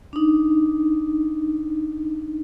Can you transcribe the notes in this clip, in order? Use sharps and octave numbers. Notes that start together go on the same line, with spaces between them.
D4 D#4